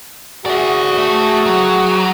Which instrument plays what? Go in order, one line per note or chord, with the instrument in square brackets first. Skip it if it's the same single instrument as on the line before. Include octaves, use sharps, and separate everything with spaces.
[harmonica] F#4 G#4 [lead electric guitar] D5 E5
[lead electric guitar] A3
F#3